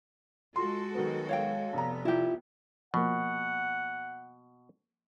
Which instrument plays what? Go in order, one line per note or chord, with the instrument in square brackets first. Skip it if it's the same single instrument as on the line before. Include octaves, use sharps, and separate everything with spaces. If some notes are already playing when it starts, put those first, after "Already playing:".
[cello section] G#3 F#4 A4 [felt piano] F4 C6
[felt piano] D#3 F#3 B3
[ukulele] C#5 F5 G5
[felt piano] F1 A#5 [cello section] B3
[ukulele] E4 G4 [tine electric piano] F4
[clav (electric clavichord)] B2 [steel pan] F3 A#3 [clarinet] F#5